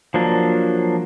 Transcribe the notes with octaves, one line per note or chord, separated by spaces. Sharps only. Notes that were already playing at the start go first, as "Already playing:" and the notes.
F3 F#3 A#3 D4